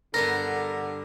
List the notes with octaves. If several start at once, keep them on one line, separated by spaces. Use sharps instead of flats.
G2 D3 B3 A4 A#4 A#6